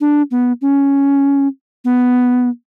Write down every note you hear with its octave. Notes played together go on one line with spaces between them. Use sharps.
D4
B3
C#4
B3